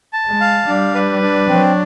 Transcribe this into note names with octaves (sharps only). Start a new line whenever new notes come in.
A5
G#3
F5
G3 D4
B4
D4
F#3 C4